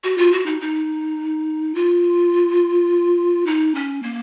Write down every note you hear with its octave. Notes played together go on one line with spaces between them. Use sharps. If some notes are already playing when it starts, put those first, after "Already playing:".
F#4
F4
F#4
D#4
D#4
F4
D#4
C#4
A#3